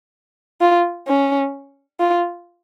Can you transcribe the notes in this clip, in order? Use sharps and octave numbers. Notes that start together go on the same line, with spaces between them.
F4
C#4
F4